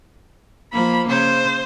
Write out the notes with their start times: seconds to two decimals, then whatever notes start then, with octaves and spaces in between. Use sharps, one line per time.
0.73 F3 A#3 B5
1.09 C#3 C5